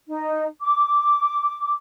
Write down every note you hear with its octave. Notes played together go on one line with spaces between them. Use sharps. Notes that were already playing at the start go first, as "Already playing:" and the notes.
D#4
D6